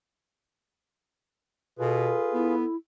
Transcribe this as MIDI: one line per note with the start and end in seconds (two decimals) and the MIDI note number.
1.79 2.14 47
1.79 2.55 65
1.79 2.55 68
1.79 2.66 69
1.79 2.55 71
2.34 2.65 59
2.34 2.76 64